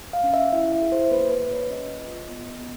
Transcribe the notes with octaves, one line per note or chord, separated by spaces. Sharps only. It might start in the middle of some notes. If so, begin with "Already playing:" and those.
F5
C#4
E5
E4 E5
E5
G#4
C5
A#3 B4
B4
A#3
C#5
C#4 D#5
F4
B3
B3